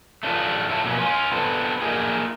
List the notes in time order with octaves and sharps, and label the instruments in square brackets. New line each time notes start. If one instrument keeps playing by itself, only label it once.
[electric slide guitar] A3 C#4 D4 F4
A2 F4 C#5 E5 G#5 A5
F2 B2 A#3 C#4
C#4 F4
B3 C4 D4 A4
A3 A#3 D4 D#4 F4 G#4